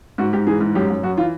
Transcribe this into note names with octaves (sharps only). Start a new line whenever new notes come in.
G#2 F#4
G#2 G4
E3 G#4
G#2
F#2 G4
F#2
F#2 F#4
E3 F4